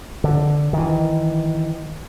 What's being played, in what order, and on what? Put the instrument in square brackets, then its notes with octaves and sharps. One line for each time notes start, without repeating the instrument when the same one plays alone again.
[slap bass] D3
D#3 E3